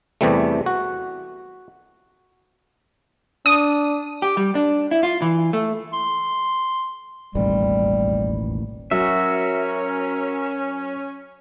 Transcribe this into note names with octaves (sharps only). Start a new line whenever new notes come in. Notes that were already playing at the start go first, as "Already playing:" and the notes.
E2 C3 E3 G3 A3
F#4
D4 D#6
G4
G3
D4
E4
F4
E3
A3
C6
E1 A1 D#2 G3
F#3 C#4 F#4 A#4 E5